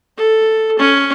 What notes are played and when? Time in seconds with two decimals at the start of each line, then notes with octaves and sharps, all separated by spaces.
0.17 A4
0.79 C#4